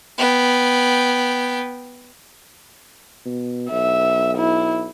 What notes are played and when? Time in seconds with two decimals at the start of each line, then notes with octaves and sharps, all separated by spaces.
0.18 B3 G5
3.25 B2
3.71 B1 E5
4.38 E4